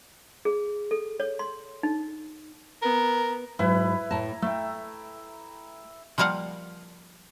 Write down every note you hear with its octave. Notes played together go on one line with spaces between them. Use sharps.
G#4
A4
C#5
C6
D#4
B3 A#4
G#2 F#3 E4 B4
A2 A5 A#5
A3 E5 G5
F3 G3 A#3 F5 F#5